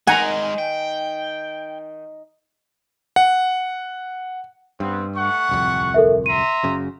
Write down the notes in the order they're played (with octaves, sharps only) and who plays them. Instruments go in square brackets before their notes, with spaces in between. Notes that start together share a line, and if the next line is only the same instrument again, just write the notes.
[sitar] D#3 [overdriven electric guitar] G#3 A#4 [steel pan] F#5 A#5 [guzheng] G#5
[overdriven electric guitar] G5
[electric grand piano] F#5
[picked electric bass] G2 [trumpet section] B3 C4
[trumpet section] A3 F#5 C#6
[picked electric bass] D1 C2 F2
[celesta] A4 A#4 E5
[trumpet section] E5 A#5 C6 [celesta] D#7
[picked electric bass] F#1 F#2 C#3